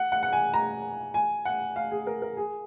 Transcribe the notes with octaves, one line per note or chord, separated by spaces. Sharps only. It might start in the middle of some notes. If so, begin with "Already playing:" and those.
Already playing: F#5
F#5
F#5
G#5
A#5
G#5
F#5
F5
G#4
A#4
A#4
G#4